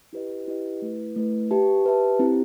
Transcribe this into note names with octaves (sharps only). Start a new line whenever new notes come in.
E4 G4 B4 D#5
E4 G4 B4 D#5
A3 E4 B4
A3 E4 B4
G4 B4 E5 A5
G4 B4 E5 A5
C4 E4 G4